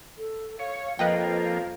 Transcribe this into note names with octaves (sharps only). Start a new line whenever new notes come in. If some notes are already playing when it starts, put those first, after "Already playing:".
A4
C#5 F5
F2 F3 A#3 B4 D#5 F5 G5